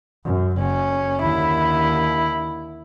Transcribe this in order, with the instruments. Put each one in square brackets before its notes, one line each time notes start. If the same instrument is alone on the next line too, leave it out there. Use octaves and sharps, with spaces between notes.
[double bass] F#2
[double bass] F#1 [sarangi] C#4
[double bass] D#2 D3 [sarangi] E4